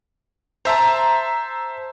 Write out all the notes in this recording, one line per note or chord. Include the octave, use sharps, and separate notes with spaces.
C5 E5 A5 A#5 C6